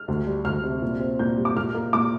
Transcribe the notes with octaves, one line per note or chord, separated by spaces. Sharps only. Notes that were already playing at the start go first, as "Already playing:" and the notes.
Already playing: F6
D2
G3
D2 F6
C3
A#2
C4
A#2 G6
G3
D6
A#2 F6
A#3
A#2 D6